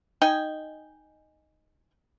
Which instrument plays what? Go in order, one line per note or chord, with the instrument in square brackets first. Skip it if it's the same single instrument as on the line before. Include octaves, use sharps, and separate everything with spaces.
[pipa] D#4 D#5 G5 G#5